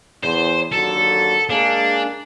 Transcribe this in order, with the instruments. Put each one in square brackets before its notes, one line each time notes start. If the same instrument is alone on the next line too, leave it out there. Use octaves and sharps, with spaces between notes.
[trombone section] E2 [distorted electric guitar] C5
[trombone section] D#2 D3 F#3 [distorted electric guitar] A4
[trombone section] G#3 A#3 G#4 [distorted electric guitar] D4